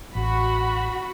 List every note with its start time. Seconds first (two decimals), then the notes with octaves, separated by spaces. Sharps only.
0.15 A1 F#4 B5